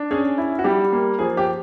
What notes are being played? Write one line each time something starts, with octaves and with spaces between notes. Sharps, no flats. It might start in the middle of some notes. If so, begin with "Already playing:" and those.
Already playing: D4
C#4 G#4
E4
F#4
G3 G4
A#3
F3 G#4
G4